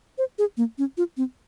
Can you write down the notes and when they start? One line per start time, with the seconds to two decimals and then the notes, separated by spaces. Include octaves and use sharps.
0.18 C5
0.39 G#4
0.57 A#3
0.78 C#4
0.97 F4
1.17 C4